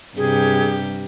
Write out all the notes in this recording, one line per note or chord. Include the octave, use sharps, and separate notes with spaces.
G2 C3 G4 G#4